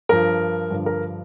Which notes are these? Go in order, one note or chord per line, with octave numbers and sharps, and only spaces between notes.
G2 F3 A#4
G2 D3 F3
A#4